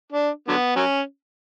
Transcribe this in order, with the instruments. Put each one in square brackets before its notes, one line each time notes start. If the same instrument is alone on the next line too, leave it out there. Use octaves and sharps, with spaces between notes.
[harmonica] D4
D3 F#3 B3
F#3 C#4